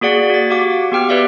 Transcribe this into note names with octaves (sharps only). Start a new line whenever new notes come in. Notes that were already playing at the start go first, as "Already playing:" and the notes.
A#3 F#4 G#4 D5 F#5
F#4 A6
F#4 G4 F5 F#5 D6
B3 G4 G5 F6
G4 B4 D5 E5 F5